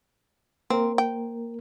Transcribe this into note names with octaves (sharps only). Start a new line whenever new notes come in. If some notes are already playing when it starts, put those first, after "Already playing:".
A#3 C4 A#4
G5